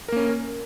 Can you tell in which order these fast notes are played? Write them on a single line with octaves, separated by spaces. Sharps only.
A#4 A#3 C#4